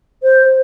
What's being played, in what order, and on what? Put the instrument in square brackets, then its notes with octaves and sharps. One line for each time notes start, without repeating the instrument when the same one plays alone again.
[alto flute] C5